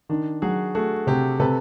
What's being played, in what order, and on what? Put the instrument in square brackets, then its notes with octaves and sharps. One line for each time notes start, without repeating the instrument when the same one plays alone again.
[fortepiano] D#3 [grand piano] D4
[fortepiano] F#3 [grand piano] F#4 G#4
[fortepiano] A3 [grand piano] F#4 G#4
[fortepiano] C3 [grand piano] G4 A4
[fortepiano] C3 [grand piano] A4 B4